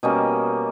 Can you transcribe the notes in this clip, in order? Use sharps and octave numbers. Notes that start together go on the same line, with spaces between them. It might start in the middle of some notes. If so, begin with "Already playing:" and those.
B2 G3 A#3 C#4 D#5